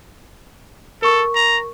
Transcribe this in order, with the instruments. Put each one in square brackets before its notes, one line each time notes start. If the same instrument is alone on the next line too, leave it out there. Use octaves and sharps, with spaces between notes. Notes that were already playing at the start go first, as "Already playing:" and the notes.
[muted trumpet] A4 [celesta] A#4 C#6
[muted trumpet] A#5